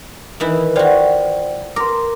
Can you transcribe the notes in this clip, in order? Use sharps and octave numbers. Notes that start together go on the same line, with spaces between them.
D#3 E3 E4
F4 F#4 C5 D5 G5
A#4 C6 D6